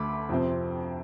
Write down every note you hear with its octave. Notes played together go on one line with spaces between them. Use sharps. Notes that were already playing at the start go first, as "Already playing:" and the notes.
Already playing: D2 D3 A3 B5 D6
F2 C3 F3 C4